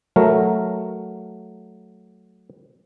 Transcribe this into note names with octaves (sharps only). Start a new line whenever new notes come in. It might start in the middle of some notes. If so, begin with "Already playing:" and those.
F#3 A3 A#4